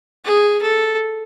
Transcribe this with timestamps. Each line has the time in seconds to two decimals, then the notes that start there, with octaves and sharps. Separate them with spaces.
0.25 G#4
0.62 A4